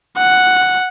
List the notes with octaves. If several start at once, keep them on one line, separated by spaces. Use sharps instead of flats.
F#5